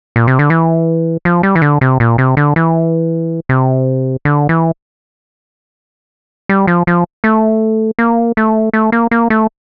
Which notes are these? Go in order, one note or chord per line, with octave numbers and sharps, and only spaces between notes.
A#2
C3
D3
E3
F3
G3
E3
D3
C3
A#2
C3
D3
E3
C3
D3
E3
G3
F3
F3
A3
A#3
A3
A3
A#3
A#3
A3